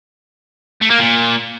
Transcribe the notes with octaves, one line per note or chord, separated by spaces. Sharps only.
A3
A#3
A#2